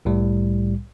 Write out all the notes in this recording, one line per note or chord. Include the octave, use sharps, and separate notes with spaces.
C2 A2 G3